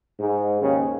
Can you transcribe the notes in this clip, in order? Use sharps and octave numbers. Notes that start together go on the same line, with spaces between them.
G#2
D#2 C#3